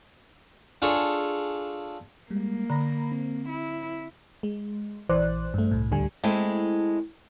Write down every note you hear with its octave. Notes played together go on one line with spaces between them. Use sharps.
D4 F4 G#4 A4 C#5
G3 G#3 A#3
D3 A#5 B5 A#6
C4
E4
G#3
A#1 E3 C5 D5 F#6
G2 A3
C2 A2
D2 D3 G3 G#5
G#3 A3 C4 E4